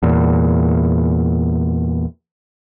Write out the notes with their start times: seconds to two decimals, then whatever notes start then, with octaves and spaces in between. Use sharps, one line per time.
0.03 E2 A#2